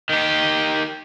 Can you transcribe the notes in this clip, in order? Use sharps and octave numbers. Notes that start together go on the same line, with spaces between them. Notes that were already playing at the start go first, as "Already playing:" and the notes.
D#3 G4